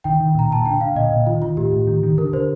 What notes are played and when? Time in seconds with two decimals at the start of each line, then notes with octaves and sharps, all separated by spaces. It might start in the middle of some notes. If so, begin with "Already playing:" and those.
0.04 D#3 G5
0.20 D#3
0.35 A#2 A#5
0.51 A#2 A5
0.66 D3 G5
0.81 D3 F5
0.96 A#2 D#5
1.11 A#2
1.26 D#3 F4
1.42 D#3 F4
1.57 A2 G4
1.73 A2
1.87 D#3
2.03 D#3
2.18 D3 A#4
2.33 D3 C5